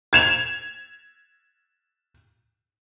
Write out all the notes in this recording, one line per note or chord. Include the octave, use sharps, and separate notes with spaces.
G#6 E7 F7